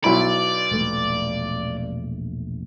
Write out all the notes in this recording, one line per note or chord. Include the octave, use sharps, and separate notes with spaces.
B1 E4 D5 B5
E1 A#1 A3